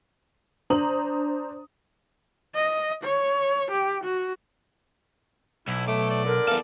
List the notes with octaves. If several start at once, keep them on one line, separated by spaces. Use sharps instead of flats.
D4 C5 A#5 D#6 F#7
D#5
C#5
G4
F#4
B1 E4
A3 D6
D5
D3 A#4
E2 E3 B3 A4 F5